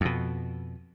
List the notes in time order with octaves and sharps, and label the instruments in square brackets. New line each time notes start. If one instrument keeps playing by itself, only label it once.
[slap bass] F2 B2